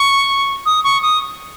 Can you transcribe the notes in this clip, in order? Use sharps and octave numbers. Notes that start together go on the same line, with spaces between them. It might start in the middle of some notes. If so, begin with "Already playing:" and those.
Already playing: C#6
D#6
C#6
D#6